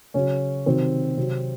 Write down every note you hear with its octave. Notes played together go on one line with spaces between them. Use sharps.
C#3 F#3 C#4
C3 D#3 F#3 C4
C3 F#3